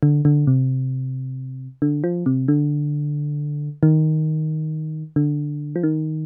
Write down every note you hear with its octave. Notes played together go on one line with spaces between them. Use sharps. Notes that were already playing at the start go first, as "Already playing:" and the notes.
D3
D3
C3
D3
F3
C3
D3
D#3
D3
F3
D#3